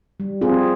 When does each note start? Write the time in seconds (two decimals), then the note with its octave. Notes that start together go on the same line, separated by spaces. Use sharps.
0.20 G3
0.41 C4 F4 G#4